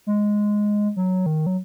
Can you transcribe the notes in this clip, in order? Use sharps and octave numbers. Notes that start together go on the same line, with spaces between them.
G#3
F#3
D#3
F#3